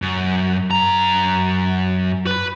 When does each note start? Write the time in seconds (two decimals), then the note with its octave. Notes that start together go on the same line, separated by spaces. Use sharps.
0.02 F#2
0.71 F#2 A#5
2.27 B4 B5